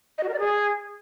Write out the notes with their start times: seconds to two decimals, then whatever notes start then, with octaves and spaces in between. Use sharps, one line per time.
0.18 D#5
0.23 F#4
0.29 A#4
0.34 D5
0.39 G#4